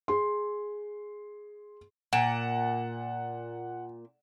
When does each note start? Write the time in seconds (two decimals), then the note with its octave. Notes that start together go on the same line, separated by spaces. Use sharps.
0.08 G#4 C6
2.13 A#2 F#5 E7